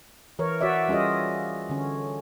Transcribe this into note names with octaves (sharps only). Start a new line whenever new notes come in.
E3 A#4 C#5
F#4 C#5 D5 E5
G3 C#4 F4 G#4 D#5
D3 C#4